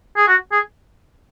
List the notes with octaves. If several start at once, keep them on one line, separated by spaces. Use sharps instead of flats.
G#4
F#4
G#4